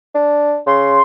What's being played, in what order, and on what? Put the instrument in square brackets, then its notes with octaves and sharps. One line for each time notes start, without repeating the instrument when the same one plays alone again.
[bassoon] D4
[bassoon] C#3 [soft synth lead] C6